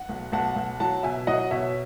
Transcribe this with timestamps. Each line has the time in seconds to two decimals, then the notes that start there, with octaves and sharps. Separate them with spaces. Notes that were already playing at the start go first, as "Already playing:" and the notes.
Already playing: F#5
0.09 B1
0.32 B1 F#5 A5
0.56 B1
0.80 F#3 F#5 A5
1.03 B2 E5 G#5
1.27 F#3 D#5 F#5
1.51 B2 C#5 E5